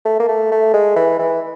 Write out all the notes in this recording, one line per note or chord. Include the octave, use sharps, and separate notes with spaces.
A3
A#3
A3
A3
G#3
E3
E3